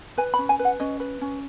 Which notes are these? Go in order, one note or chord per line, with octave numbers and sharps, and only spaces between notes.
B4 G#5
B5
C#4
G#5
B4
F#5
C#4 D#5
B4
C#4